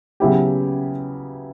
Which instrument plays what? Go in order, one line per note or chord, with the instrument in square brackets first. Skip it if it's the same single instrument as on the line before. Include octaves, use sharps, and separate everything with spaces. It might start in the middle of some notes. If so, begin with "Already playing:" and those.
[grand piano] C#3 F#3 B3 E4 G4